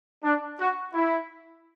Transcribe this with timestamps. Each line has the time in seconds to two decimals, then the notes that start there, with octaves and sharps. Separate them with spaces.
0.24 D4
0.59 F#4
0.94 E4